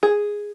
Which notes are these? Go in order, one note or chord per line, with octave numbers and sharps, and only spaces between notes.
G#4